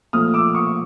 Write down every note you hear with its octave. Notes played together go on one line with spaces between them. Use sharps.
A#2 F3 A3 C4 D#6 F6
D6 E6
C#6 D#6